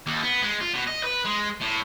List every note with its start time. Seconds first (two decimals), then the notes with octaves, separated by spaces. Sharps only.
0.06 D#2
0.23 B3
0.42 G#3
0.61 F4
0.74 B2
0.87 D#5
1.04 B4
1.25 G#3
1.61 A2